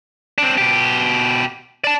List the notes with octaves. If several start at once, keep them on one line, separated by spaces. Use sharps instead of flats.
C4 D4
B2 G4
D5 A5